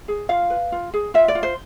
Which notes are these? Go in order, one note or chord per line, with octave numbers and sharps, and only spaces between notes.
G#4
F4 F5
B4
F4
G#4
F4 E5
D5
F4
C5